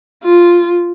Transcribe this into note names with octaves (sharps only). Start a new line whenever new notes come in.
F4